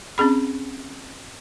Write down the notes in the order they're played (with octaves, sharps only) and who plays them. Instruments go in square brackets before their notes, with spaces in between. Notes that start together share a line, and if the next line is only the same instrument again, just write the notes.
[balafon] C4 C#4 G#4 B5